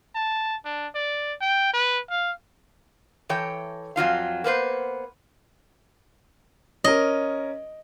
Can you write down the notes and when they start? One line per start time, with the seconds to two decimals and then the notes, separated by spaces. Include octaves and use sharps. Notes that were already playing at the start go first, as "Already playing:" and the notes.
0.15 A5
0.65 D4
0.95 D5
1.41 G5
1.74 B4
2.10 F5
3.29 E3 A4 C#5 G5
3.96 F2 F#3 F4 F5
4.44 A#3 B3 B4 C5
6.84 C#4 A#4 D#5